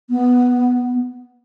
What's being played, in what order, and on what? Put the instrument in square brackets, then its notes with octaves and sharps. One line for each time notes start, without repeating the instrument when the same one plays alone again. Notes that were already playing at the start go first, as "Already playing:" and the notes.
[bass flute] B3